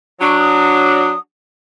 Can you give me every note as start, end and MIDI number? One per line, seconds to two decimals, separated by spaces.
0.21 1.10 54
0.21 1.10 62
0.21 0.37 85
0.39 1.19 87